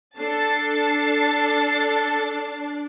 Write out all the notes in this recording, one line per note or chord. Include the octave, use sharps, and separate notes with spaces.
D4 A4 A5 A6 C7